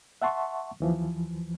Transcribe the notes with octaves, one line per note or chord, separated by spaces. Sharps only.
E5 F#5 A5 C6 C#6
D#2 E3 F3